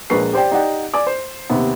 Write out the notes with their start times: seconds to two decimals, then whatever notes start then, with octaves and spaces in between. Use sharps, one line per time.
0.10 A#1 G#3 A#3 B4 C#6 C7
0.33 G4 C5 D5 G5
0.52 D#4 G4 D5 F#5 G5
0.94 D5 G#5 D6
1.07 C5
1.49 D#2 C3 B3